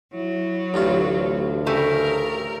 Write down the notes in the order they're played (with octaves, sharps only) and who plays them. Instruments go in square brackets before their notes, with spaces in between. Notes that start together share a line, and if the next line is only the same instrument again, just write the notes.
[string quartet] F#3 [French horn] E4
[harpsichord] A1 G2 F4 [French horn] D2
[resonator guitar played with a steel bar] C#3 G3 A3 [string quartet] A#4